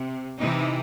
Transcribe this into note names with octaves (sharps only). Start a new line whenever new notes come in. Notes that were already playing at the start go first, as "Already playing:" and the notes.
Already playing: C3
C3 E3 D#4